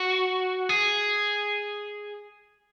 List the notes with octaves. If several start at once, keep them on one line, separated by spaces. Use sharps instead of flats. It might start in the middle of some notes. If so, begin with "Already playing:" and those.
Already playing: F#4
G#4